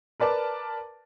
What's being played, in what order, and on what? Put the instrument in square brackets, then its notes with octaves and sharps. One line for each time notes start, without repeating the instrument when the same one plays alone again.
[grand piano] A#4 B4 D5 A5 D6